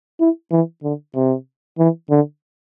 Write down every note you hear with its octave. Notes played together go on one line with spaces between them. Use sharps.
E4
E3
D3
C3
E3
D3